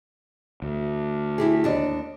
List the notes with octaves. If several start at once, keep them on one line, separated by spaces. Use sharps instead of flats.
D2
E4 G4 G#4
D#2 D4 D#5